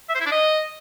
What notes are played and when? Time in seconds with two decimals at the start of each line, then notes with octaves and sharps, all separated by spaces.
0.09 E5
0.15 C5
0.20 E4
0.26 D4
0.31 D#5